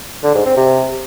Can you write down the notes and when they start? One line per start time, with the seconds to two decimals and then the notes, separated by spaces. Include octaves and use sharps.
0.24 D3
0.35 G#2
0.46 C4
0.57 C3